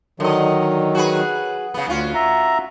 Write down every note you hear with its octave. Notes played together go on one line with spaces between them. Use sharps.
D3 D#3 F#3 D#5
F#4 G#4 B4
C#3 B3
D2 C#4 F4 F#4
E5 A#5